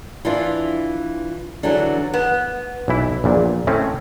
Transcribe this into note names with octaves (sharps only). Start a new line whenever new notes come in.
E3 D4 E4 F4
D3 E3 F#3 D4
B3
B1 E3 E4
A#1 E2 A#2
A2 A3 C4 C#4